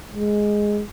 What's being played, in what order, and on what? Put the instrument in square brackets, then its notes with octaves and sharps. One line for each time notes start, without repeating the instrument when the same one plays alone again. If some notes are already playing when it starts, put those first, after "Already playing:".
[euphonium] G#3